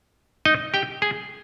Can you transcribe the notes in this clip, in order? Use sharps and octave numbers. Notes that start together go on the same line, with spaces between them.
D#4 D#5
G4 G5
G#4 G#5